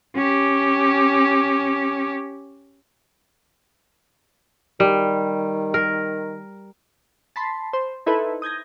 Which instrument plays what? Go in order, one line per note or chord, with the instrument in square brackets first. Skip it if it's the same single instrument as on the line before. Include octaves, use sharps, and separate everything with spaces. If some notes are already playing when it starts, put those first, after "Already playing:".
[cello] C#4 G4
[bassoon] D#3 [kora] G3
[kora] A#4
[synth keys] A5 B5 C6
C5
D#4 E4 A4 B4 C5
D#6 G6 G#6 A#6